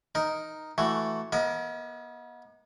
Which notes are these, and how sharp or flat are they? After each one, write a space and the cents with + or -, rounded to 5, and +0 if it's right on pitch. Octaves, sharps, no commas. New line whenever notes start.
D#4 +0 A#4 +0
E3 +0 A3 +0 F#4 +0
B3 -35 A#4 -10 D#5 +30